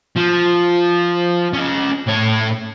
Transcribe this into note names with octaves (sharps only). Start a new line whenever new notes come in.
F3
C#4 D#5
A2 C#5